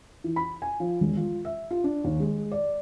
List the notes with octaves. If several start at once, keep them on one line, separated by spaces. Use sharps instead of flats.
E3
B5
G#5
F3
E1
F4
E5
F4
D4
D#2
G#3
D5